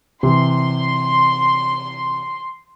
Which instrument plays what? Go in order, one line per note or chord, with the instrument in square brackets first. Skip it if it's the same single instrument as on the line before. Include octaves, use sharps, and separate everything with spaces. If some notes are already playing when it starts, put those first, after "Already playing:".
[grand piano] C3 E3 [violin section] C6